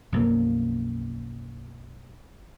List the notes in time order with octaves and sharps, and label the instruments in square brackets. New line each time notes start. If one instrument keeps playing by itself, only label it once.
[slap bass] B1 F#2 F3 A#3